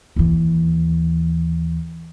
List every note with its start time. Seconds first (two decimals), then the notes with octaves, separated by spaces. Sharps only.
0.16 D#2 E3